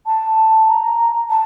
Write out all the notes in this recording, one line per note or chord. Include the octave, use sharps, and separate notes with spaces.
A5
A#5
A5